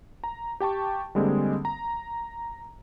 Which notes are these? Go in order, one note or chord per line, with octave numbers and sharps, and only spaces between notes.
A#5
G4 G5 A5 C#6
D3 G3 G#3 A#3 C4
A#5